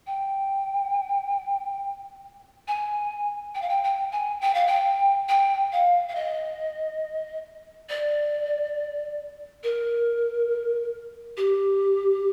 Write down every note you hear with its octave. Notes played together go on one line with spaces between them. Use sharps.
G5
G#5
G5
F5
G5
G5
G#5
G5
F5
G5
G5
F5
F5
D#5
D5
A#4
G4